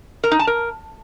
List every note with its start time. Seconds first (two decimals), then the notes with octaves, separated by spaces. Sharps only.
0.24 A#4
0.32 D#4
0.39 A5
0.47 A#4